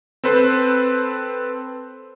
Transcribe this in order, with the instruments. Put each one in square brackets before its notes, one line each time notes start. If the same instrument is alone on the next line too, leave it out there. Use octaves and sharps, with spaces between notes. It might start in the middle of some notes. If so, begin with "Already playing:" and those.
[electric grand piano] C4 A4 B4 C5